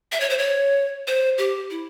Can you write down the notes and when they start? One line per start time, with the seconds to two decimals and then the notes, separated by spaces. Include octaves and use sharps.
0.12 E5
0.20 C#5
0.30 C5
0.38 C#5
1.07 C5
1.38 G4
1.70 E4